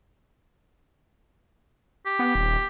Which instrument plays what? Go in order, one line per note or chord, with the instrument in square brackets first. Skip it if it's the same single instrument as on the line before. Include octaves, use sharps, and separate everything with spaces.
[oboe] G4
[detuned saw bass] B3
D#1